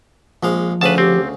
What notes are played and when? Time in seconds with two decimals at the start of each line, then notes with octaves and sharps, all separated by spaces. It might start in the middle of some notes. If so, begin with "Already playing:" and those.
0.43 A#1 F3 G#3 F5
0.81 D2 C#3 B4 F5 A5
0.98 C4 G4